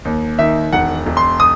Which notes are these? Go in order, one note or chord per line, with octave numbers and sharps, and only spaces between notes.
D#2
D#3 E5
E1 F#5
E1
C6
D#6